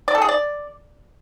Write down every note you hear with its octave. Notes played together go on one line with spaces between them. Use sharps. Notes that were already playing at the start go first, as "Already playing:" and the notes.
D5
A4
G#4
D5